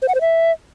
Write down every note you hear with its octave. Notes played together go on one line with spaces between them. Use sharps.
C5
F#5
C5
E5